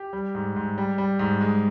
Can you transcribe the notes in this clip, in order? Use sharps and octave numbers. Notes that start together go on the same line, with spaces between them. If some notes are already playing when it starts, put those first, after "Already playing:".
Already playing: G4
G3
G#2
G#2
G3
G3
G#2
G#3